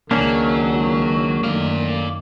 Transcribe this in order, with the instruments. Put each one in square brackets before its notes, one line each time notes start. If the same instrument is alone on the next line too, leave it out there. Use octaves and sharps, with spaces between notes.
[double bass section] C#2 D#3 [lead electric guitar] F#3 [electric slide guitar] A#3 C#4 D4
[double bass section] F#2 D#3 A3 [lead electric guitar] D5 F5